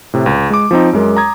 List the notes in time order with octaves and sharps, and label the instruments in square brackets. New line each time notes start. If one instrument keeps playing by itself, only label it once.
[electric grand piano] A2 C3
C#2
G#3 D6
F3 C4 D#4
F#2 G#3 A#4
A#5 D#6 G#6